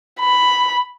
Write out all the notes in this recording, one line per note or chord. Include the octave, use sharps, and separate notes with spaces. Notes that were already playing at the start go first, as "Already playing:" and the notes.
B5